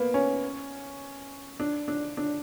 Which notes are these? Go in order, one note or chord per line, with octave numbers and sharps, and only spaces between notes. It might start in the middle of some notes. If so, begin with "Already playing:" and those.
Already playing: A#3 B3
C#4
D4
D4
D4